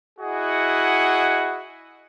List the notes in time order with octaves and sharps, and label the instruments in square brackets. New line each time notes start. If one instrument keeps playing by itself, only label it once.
[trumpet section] E4 F#4 G#4 D#5 F#5